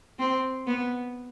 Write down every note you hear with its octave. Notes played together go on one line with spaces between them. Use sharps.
C4
B3